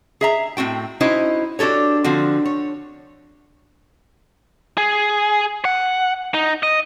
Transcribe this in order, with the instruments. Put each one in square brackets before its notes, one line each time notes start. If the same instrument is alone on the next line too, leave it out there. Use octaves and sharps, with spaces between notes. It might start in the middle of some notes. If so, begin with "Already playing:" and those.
[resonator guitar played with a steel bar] G#4 E5 A#5
A2 C4 F#4 G5
C#4 D#4 E4 F#4 C5 D#5
D4 F#4 G4 A4 C#5
D3 F3 C4 F#4
C#5
[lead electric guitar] G#4
F#5
D#4
D#5